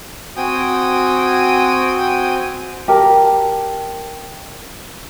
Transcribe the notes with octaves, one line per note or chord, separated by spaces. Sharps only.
C4 F#4 G5 G#5 D#6
G4 A#4 A5